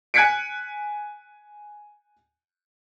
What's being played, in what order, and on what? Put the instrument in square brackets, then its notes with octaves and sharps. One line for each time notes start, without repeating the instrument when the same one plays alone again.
[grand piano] G#5 F#6 G#6 B6 C#7 D7